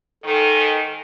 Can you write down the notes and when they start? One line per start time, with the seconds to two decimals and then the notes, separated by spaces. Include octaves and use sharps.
0.24 G#2 D#3 A4